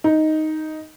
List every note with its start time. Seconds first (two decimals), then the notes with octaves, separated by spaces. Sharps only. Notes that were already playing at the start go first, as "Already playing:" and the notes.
0.04 D#4